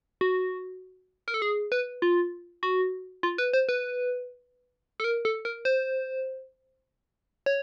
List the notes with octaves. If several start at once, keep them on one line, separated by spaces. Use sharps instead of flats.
F#4
A#4
A4
G#4
B4
F4
F#4
F4
B4
C5
B4
A4
A#4
A4
A#4
C5
C#5